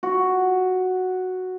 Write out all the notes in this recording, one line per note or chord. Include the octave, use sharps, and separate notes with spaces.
F#4